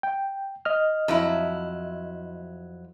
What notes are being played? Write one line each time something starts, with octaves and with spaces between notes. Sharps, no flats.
G5
D#5 F6
F2 F#3 E4